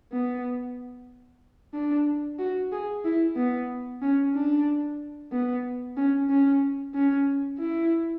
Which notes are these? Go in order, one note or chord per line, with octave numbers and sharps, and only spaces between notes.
B3
D4
F#4
G#4
E4
B3
C#4
D4
B3
C#4
C#4
C#4
E4